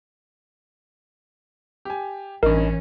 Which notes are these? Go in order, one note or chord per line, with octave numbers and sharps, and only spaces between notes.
G4 G#5
A1 G2 E3 C#4 D#4 A#4